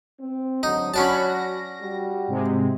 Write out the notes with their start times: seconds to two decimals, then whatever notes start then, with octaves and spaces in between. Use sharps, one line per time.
0.19 C4
0.63 G#2 D3 F#3 D#4
0.94 F#3 C#4 D4 F#4 C#5 A5 B5
1.27 A#6
1.81 G3 F#4
2.28 G#2 C3 G#3